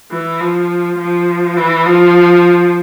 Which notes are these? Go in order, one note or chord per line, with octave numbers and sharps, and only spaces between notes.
E3
F3
F3
E3
F3